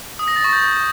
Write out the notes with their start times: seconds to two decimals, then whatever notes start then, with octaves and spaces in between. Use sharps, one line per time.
0.19 D#6
0.28 A#6
0.36 A6
0.44 C#6
0.53 G6